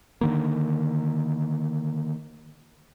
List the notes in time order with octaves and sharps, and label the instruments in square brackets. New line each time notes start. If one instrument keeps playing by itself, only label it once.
[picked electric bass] D3 D#3 A#3